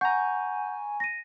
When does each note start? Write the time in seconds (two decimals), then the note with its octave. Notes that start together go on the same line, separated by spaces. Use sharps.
0.01 F#5 G#5 A#5 C#6 G6
1.00 A#6 D#7